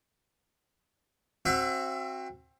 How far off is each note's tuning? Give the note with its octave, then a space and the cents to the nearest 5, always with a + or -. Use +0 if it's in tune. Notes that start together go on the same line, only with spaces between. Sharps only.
C4 +20 F#4 +0 E5 +35